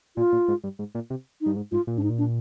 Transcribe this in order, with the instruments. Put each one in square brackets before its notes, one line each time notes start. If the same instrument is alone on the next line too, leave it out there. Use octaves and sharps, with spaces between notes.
[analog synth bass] A#2 [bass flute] F4
[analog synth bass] A#2
G#2
G2
G#2
A#2
C3
[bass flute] D#4
[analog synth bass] G2
G#2
[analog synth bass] G#2 [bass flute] F4
[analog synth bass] A#2
[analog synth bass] G#2 [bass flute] D4
[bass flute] D#4
[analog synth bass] A#2
[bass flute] D4